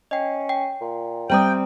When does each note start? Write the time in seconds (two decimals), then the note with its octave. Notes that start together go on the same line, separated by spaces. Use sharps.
0.11 C#4 D#5 G5
0.49 G5
0.81 A#2
1.30 C3 G3 C4 C5 D5 G5 A#5 D#6